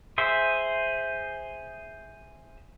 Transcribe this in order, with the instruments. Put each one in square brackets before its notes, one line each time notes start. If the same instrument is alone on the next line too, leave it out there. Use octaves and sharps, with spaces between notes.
[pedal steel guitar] G#4 C5 E5